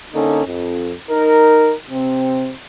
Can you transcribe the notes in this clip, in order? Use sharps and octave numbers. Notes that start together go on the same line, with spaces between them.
D3 A#3 C#4 D#4 A4
F2
D#4 A#4
C3 C4